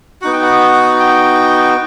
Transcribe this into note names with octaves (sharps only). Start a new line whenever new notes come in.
B3 D#4 F#4 F#5
G5
F#5
G5